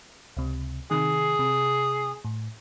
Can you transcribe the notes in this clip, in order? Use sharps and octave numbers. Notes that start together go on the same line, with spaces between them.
C#2 C3
C3 D#3 G#4
C3
A2